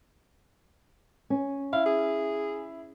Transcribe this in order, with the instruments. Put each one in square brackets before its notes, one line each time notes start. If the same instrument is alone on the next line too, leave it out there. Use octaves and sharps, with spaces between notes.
[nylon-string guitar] C#4
[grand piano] E4 [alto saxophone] F5
[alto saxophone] G#4